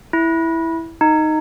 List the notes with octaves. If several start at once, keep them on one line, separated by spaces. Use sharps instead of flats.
E4
D#4